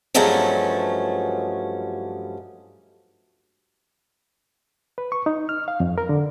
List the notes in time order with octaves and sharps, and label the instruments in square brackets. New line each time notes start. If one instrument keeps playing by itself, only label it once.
[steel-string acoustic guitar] G2 F3 F#3 G#3 A3 C#4
[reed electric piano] B4
C#6
D#4
F6
F5
F2
A#4
D3